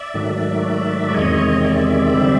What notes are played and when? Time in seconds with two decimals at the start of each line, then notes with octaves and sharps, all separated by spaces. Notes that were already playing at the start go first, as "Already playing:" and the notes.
Already playing: D5 E5
0.14 G#2 D#3 F#3 A3
1.14 E2 C3 D#3 G#3 C#5 D#5
1.64 D5 E5
2.14 D3 G3 C4